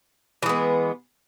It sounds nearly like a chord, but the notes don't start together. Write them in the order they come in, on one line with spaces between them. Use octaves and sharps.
E3 G#3 B3